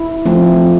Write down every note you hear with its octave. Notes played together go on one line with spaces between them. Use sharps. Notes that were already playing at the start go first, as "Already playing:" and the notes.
Already playing: E4
F3 A3 C4